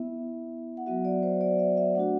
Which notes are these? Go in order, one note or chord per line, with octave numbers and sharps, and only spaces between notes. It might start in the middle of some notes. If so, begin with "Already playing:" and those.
Already playing: B3 E4 E5
F#5
F#3 B3 F#4 E5
D5
C5
D5
E5
E5
A3 D4 F#4 F#5